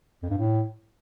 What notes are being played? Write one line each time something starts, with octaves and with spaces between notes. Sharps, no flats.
F2
G2
A2